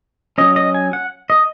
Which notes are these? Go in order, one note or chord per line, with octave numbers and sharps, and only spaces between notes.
F#3 C#4 D#5
D#5
G#5
F#5
D#5